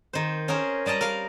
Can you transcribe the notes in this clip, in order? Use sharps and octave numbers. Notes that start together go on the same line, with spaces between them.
D#3 C5
C#4 G#4 A#4 C5
G3 D5 D#5 A5 A#5
A#4 F5